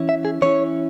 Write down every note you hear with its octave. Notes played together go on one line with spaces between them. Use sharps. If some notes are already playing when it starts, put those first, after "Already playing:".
Already playing: E3 C#4 E4
E5
G#4
E3 C#4 E4 C#5